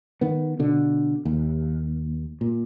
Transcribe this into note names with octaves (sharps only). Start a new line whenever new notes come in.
D#3 B3
B2 D3
D#2
A#2